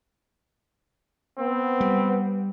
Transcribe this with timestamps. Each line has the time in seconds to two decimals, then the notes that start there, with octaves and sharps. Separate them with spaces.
1.39 B3 C4
1.81 G3